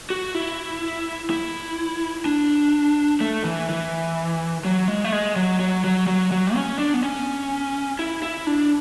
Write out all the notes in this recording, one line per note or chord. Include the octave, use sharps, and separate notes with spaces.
F#4
E4
E4
D4
A3
E3
E3
F#3
G#3
A3
G#3
F#3
F#3
F#3
F#3
F#3
C#4
D4
B3
C#4
E4
E4
D4